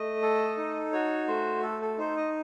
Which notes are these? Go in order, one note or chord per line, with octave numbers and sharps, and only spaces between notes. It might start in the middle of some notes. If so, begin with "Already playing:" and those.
Already playing: A3 D#5
A4
D#4
F#4 C#5
A3 C5
A4
A4
D#4 C5
D#5